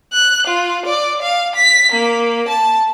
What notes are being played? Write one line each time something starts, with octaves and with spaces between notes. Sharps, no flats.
F#6
F4
D5
F5
B6
A#3
A5